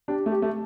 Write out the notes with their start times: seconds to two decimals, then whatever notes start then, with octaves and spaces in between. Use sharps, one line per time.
0.08 D4 G4
0.26 A3
0.31 G4
0.42 A3